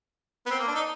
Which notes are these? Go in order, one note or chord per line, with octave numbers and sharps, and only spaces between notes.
B3
C4
A#3
D4
D#4